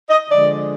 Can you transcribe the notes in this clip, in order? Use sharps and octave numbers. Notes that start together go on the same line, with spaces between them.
D#5
D3 F3 G#3 D5